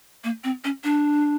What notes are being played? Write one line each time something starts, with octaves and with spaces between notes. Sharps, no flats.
A#3
C4
C#4
D4